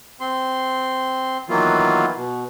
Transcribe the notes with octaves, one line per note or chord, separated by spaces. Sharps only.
C4 C6
D#3 E3 F#3 A#3 B3 F4
B2